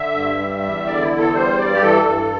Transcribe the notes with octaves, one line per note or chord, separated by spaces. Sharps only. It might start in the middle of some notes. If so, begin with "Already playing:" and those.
Already playing: D3 E5
G2
G3
E2
D3 D5
E4
E2
A4
G3 C5
G2 D5
G4
E3 A4
G2